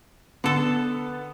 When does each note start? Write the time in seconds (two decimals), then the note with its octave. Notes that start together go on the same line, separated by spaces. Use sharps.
0.44 D3 B3 A4